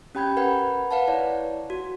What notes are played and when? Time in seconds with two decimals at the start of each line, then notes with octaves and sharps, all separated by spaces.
0.15 C#4 G4 G5 B5 G6 G#6
0.37 A#4 B4 F#5 B5 G#6
0.91 B4 F5 F#5 A5
1.08 E4 C#5 D5
1.70 F#4